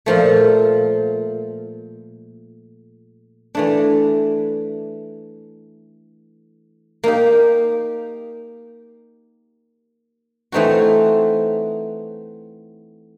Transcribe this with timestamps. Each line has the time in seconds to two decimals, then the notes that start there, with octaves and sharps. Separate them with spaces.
0.06 A#2 F3 A3
3.55 E3 A3 D4
7.04 A#3 D#4 G4
10.52 E3 A3 C4 D#4 F#4